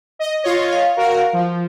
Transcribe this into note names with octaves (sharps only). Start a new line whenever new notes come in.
D#5
F4 C#5 D#5
F5
F#4 A#4
F3